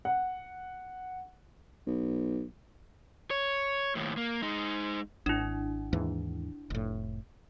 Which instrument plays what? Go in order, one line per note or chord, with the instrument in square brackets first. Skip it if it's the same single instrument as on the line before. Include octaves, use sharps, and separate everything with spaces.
[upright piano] F#5
[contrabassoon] B1
[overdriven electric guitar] C#5
D#2 A2
A#3
G#3 D#4
[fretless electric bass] G#1 [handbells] D4 E4
[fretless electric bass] D#2 G#2 E3
F1 A2